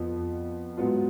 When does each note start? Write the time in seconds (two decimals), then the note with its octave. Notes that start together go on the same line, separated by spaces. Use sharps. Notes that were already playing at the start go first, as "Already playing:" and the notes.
Already playing: F2 F3 B3
0.77 G#2 F#3 B3 F4